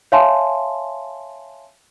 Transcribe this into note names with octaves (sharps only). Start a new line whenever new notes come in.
C#5 E5 F5 G#5 A5 C6